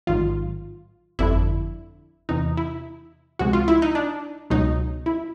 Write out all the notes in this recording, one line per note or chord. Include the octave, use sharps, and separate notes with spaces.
A1 G#2 D#3 F#3 F4
G1 F2 D3 E4
E2 C3 E3 D#4
E4
C#2 C3 F3 G#3 F#4
F4
E4
D#4
D4
C#2 B2 F#3 D#4
E4